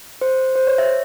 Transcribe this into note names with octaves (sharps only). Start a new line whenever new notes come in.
C5
C5
C#5
E5